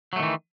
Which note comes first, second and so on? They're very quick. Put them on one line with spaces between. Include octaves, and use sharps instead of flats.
F#3 A3 D#3 E3